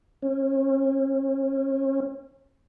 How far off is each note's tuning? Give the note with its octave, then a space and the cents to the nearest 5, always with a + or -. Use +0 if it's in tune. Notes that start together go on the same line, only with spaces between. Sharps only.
C#4 -40